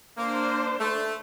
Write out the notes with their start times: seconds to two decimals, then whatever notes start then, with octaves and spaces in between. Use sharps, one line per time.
0.18 A#3 D4 C5
0.80 A3